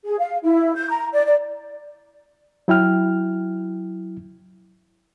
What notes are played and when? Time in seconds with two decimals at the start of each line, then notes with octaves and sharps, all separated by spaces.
0.05 G#4
0.19 F5
0.43 E4
0.75 G6
0.89 A#5
1.13 D5
1.26 D5
2.68 F#3 E4 G5 F6